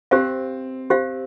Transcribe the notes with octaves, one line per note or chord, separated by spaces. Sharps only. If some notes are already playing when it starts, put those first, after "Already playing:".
C4 G4 C5 F5
G4 C5 F5